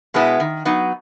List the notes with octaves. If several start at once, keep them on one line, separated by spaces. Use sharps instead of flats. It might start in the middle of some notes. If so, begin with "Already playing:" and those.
B2 G#3 B3 E4
D#3
F#3 B3 D#4